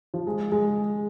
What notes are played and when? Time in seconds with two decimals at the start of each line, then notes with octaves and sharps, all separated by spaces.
0.14 F3
0.27 G#3
0.52 G#3